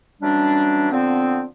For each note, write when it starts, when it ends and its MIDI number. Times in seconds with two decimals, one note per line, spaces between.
0.22 0.89 52
0.22 0.89 54
0.22 0.89 55
0.22 0.89 61
0.22 0.89 62
0.91 1.43 50
0.91 1.43 53
0.91 1.43 59
0.91 1.43 60